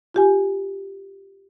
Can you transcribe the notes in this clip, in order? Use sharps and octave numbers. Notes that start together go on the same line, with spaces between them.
F4 G4 G#5